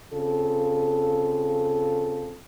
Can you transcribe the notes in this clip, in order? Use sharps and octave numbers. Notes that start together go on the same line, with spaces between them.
C#3 C4 F4 A4